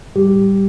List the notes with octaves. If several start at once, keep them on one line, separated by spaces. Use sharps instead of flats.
A2 G3 G4